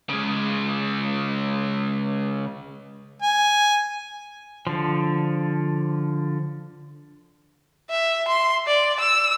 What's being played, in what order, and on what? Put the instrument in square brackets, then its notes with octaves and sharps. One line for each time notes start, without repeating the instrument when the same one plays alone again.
[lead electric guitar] C#3 G#3
[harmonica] G#5
[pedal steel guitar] D3 F3
[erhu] E5
C6
D5
E6